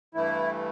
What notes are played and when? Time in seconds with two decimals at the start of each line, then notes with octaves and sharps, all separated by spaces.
0.14 G2 E3 A3 E4